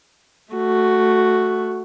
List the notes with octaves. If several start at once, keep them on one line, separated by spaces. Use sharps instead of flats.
A3 F#4